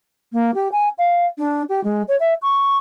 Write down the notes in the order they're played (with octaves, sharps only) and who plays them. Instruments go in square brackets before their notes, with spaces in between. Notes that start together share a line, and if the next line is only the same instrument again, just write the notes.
[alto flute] A#3
G4
G#5
F5
D4
G4
G#3
C#5
E5
C#6